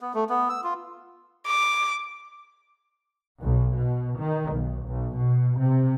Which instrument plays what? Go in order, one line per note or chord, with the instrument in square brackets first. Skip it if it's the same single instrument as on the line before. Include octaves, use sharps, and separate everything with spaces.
[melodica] B3
A3
B3
E6
F4
[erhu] D6
[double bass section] B1
B2
D#3
B1
B1
B2
C3